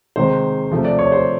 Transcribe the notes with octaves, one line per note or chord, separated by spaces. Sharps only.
C3 D#3 G#3 C5
C3 F3 A3
D5
C#5
C5